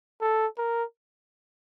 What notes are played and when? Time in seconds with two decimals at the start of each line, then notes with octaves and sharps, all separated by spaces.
0.21 A4
0.58 A#4